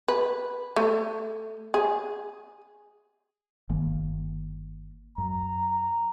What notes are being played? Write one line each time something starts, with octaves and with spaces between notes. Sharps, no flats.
B4
A3
G#4
G1 D#3 A#3
F#2 A#5